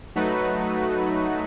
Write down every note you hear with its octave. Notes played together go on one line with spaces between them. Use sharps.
F#3 A3 D#4 F#4 B4